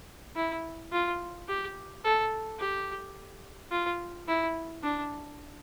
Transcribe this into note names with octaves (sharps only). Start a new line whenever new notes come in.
E4
F4
G4
A4
G4
F4
E4
D4